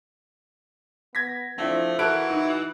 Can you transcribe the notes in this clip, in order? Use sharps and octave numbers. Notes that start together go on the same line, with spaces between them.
B3 G#6 A#6 B6
F3 A3 C4 D4 E4
E3 E4 F#4 A4 A#4 F#6 D7
D#4